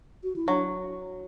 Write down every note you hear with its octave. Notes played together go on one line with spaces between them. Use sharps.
F#4
E4
F#3 D4